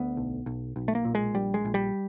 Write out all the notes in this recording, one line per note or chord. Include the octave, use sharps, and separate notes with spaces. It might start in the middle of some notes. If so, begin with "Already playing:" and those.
Already playing: D2 B3
B1
B1
B1
A3
A#3
A#2
G#3
A#1 G3
G#3
A#1
G3